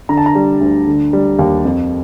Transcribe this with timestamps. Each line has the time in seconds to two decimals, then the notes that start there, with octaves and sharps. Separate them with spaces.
0.09 D3 A#5
0.17 A5
0.26 A#5
0.35 G3
0.61 D2
0.87 D3
1.13 G3
1.39 D#2
1.65 F2